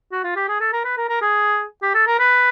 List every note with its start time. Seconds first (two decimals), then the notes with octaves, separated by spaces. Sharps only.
0.12 F#4
0.24 F4
0.36 G4
0.48 G#4
0.61 A4
0.73 A#4
0.85 B4
0.97 A#4
1.09 A#4
1.22 G#4
1.82 G4
1.95 A4
2.07 A#4
2.19 B4